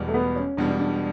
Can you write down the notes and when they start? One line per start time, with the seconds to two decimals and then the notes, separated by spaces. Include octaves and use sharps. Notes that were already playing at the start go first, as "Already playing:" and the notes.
Already playing: E1 E2 B2 G3
0.08 A3
0.14 B3
0.36 C#4
0.57 E1 E2 B2 G3 D4
0.79 D4